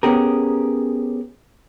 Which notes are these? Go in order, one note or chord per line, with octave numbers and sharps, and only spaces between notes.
B3 C#4 G4 G#4 A#4